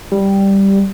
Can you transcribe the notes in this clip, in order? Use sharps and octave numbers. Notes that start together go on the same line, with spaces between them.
G3